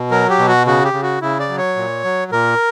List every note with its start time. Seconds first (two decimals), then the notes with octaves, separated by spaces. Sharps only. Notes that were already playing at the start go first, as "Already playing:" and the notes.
Already playing: B2
0.11 F#3 A#4
0.30 G4
0.39 B2
0.48 F#4
0.66 C#3 F#4
0.85 G4
0.93 C#3
1.03 F#4
1.21 C#3 E4
1.40 D5
1.49 F#3
1.58 C#5
1.76 A#2
2.04 F#3
2.32 A#2 A#4